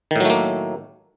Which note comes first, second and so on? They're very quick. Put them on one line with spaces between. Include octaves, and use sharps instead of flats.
D#3 A2 F#3 A3 A#3